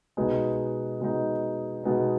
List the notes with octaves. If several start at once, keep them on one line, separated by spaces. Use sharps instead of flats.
B2 G#3 B3 D#4
B2 G#3 B3 D#4
B2 G#3 B3 D#4